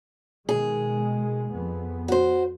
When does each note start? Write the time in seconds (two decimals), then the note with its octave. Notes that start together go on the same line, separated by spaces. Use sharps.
0.49 B2 D#3 G#3 G#4
1.54 F2 B3
2.08 F#4 C5